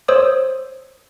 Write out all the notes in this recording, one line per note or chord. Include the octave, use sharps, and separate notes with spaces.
C5 C#5 D#6 E6